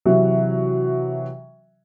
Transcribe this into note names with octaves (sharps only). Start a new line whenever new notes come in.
C3 E3 F#3